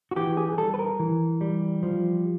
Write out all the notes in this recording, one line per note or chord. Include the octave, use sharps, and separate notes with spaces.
F#4
E3 G4
G#4
G#4
G3 A4
B4
A#4
E3
G3
F3